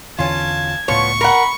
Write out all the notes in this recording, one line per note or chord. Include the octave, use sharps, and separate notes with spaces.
E2 D3 E3 C#4 F4 A5 G#6
C#2 A2 F3 B3 C#5 C#6
A#4 F#5 B5